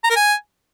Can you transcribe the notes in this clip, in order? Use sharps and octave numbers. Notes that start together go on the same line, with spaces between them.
A#5
A#4
G#5